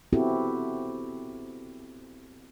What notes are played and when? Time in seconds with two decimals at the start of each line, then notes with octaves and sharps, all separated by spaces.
0.13 B3 C4 E4 F#4 G4 A4